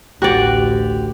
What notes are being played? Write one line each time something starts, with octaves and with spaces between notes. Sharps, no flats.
A1 D2 F#4 G4 D5